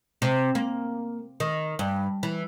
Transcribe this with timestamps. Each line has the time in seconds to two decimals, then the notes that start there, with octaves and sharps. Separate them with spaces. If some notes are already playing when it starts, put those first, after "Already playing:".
0.22 C3
0.55 A#3
1.40 D#3
1.79 G2
2.23 E3